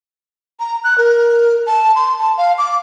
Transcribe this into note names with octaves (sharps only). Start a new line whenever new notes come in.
A#5
F#6
A#4
A5
C6
A5
F5
D6